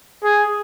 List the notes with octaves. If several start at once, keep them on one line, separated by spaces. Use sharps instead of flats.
G#4